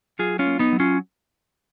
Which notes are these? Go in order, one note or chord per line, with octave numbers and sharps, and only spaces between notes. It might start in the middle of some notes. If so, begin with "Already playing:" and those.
F#3 F4 G#4
C#4 F4
A#3
B3 D#4
F#3
C#4 F4